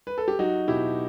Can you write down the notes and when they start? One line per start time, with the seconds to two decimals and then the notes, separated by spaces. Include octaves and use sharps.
0.07 B4
0.18 A4
0.28 G4
0.39 F#3 D#4 F#4
0.68 B2 E4 G4